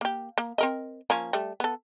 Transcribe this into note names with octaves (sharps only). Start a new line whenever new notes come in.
A#3 G4
A#3
C4 A#4 D#5
F3 A#3 C#4
G3 A3
B3 A4